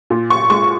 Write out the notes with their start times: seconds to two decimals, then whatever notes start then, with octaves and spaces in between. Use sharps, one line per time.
0.10 A#2
0.30 C#6
0.50 G#3 C#6